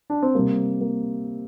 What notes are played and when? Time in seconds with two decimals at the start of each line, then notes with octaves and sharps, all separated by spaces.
0.10 D4
0.23 C4
0.35 C3 G3 A#3
0.81 A#3